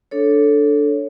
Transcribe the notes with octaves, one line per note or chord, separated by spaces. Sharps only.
D4 A4 C#5